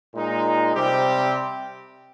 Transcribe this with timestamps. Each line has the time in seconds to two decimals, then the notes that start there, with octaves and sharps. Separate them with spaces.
0.14 A#2 G#3 D#4
0.75 C3 G3 C4 G4